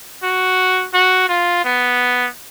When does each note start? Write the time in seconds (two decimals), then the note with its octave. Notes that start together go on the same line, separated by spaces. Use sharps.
0.23 F#4
0.94 F#4
1.29 F4
1.65 B3